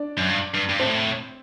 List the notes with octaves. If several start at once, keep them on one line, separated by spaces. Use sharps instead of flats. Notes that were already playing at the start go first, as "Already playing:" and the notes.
Already playing: D4 D5
F#2
G2
G2
G2
A2 C4 C5